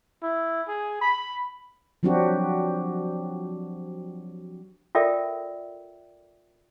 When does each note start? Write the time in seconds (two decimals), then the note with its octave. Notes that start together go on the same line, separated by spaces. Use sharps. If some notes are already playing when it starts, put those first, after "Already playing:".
0.23 E4
0.68 G#4
1.01 B5
2.03 F3 F#3 C4 D4 F#4 G4
4.95 F4 A4 A#4 D5 E5 G5